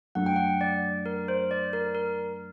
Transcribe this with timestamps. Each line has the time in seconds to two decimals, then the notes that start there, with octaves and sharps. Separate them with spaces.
0.15 F#2 F#3 A3 D4 F#5
0.26 G5
0.36 F#5
0.61 D5
1.06 A#4
1.28 C5
1.51 D5
1.73 A#4
1.95 A#4